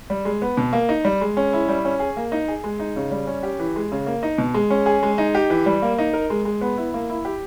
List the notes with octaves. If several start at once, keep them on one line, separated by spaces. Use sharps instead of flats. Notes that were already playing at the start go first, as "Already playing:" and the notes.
G3
G#3
B3
B2
A#3
D#4
G3
G#3
C#4
E4
G3
C#4
G#4
A#3
D#4
G#4
G#3
D#4
C#3
G3
C#4
G4
E3
G#3
C#3
A#3
D#4
B2
G#3
C#4
G#4
G#3
D#4
G4
E3
G3
A#3
D#4
A#4
G#3
G#3
B3
E4
A#3
E4
G4